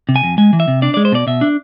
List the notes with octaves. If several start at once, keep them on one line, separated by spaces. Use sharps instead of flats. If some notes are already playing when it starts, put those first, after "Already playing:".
C3
G#5
F2
G#3 G#5
E3
E5
C3
D4 D5
G#3 D5
C5
B2 D5
B2 E5
D4